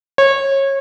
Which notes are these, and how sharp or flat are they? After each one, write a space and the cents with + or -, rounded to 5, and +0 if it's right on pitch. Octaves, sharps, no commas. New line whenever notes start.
C#5 -25